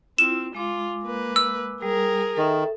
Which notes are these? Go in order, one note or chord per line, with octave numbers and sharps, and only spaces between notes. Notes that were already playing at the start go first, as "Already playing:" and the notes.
C4 E4 F4 E7
G#3 F4 D6
A#3 B4
E6
G3 G#4 A#4
D#3 A4 E5